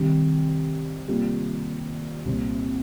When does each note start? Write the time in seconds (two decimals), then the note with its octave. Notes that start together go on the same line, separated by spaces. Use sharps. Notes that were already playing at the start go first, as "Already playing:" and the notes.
Already playing: C3 D#3 G3 C4 G4
1.08 C3 G3 A#3 F4
2.25 C2 A#2 G3 C4